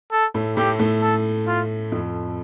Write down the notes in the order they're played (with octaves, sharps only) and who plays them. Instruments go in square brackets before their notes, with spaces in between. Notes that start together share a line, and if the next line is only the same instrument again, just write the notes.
[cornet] A4
[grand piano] A2 A3
[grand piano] A2 A3 [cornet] G4
[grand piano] A2 A3
[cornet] A4
F4
[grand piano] F2 F3